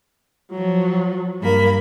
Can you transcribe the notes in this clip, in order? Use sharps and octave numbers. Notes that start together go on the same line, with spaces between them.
F3 F#3
G2 A#3 B5